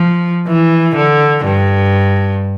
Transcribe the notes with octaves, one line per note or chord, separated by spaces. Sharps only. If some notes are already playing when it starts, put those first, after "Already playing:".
Already playing: F3
E3
D3
G2